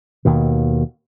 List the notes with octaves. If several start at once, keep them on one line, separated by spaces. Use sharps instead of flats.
D#2 B2 D#3